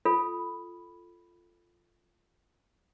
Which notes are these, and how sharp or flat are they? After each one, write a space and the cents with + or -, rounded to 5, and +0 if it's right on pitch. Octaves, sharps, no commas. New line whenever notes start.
F4 -10 A4 +0 B5 +0